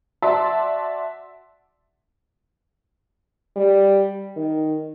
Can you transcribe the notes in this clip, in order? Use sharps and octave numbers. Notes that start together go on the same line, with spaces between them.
F#4 D5 E5 A5 C6
G3
D#3